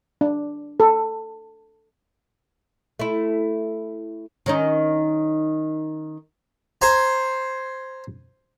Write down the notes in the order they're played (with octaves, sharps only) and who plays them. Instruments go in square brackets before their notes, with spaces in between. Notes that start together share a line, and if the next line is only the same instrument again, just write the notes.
[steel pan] D4
A4
[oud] A3 E4
D#3 C#4 D#4
[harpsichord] C5 G#5 A#5